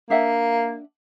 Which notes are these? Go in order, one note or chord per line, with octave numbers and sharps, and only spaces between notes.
A#3 D4 E5 F#5